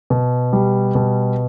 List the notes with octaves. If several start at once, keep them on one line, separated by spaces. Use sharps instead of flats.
B2
G3
B2